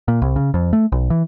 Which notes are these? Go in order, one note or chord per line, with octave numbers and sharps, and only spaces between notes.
A#2
C2
C#3
F2
A3
B1
E3